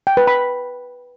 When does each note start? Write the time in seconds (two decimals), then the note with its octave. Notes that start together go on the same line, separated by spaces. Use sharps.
0.07 G5
0.17 B4
0.27 B5